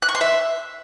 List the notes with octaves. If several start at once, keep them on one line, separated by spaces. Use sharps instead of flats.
F#6
C#6
C6
E5